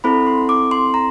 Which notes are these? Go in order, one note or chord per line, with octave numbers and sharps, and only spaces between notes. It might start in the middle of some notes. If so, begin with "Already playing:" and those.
C4 E4 A4 B5
C6
D6
C6
A#5